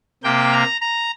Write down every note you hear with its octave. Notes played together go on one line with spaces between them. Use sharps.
C3 A#3 G5
A#5
A#5